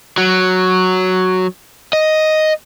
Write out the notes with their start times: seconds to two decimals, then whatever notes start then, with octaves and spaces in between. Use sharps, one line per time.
0.18 F#3
1.93 D#5